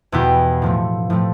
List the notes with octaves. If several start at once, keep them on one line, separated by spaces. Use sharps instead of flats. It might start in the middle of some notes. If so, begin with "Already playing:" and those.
E2 B2 B3 E4 G4
A2 F3 A3
A2 F3 A3